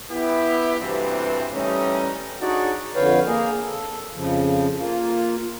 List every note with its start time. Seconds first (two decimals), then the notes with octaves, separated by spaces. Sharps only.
0.11 B3 E4 G4
0.80 D2 G2 C3 E3 G3 C4
1.53 E3 G3 A3 C#4 D#4
2.41 D4 D#4 F#4 G#4 C#5 D5
2.95 F2 D3 B4 C#5 F5 G5
3.27 A#3 G#4 A#4
3.61 A4
4.15 F2 C#3 F3
4.78 A#3 F4